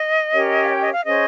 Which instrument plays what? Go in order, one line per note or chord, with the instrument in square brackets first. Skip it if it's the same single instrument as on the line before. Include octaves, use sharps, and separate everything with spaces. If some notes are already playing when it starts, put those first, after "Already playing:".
Already playing: [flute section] D#5
C#4 G4 A#4 C#5
F5
G5
D#5
F5
C#4 G#4 C5 D#5